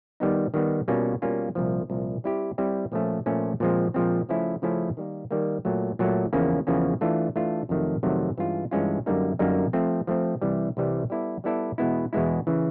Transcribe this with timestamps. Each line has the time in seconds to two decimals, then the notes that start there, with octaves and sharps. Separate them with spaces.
0.20 D#3 G3 B3 D#4
0.54 D#3 G3 B3 D#4
0.88 B2 G3 A#3 C#4 F4
1.22 B2 G3 A#3 C#4 F4
1.55 C2 A#2 F3
1.90 C2 A#2 F3
2.24 G3 C4 E4 G4
2.58 G3 C4 E4 G4
2.92 A#2 F3 A3 C#4
3.26 A#2 F3 A3 C#4
3.60 A#2 F3 G#3 C4
3.94 A#2 F3 G#3 C4
4.29 C#3 F3 A3 C#4 E4
4.62 C#3 F3 A3 C#4 E4
4.97 D#3 G3 A#3
5.31 D#3 G3 A#3
5.65 A#2 F#3 A3
5.99 A#2 F#3 A3
6.33 E2 C#3 F3 A#3 C#4
6.67 E2 C#3 F3 A#3 C#4
7.01 E3 A3 D4 F4
7.36 E3 A3 D4 F4
7.69 F2 C3 D#3 F#3 A3
8.03 F2 C3 D#3 F#3 A3
8.37 G2 E3 G#3 C#4 F4
8.71 G2 E3 G#3 C#4 F4
9.06 F#2 D3 G3 A#3 D#4
9.39 F#2 D3 G3 A#3 D#4
9.73 F3 A3 C4
10.07 F3 A3 C4
10.42 C2 C3 E3 G3
10.77 C2 C3 E3 G3
11.10 G3 B3 E4 A4 D5
11.44 G3 B3 E4 A4 D5
11.78 E2 B2 G#3 B3 E4
12.13 E2 B2 G#3 B3 E4
12.47 C#3 E3